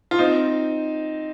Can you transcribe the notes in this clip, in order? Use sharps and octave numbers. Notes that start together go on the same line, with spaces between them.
F4
C4 D#4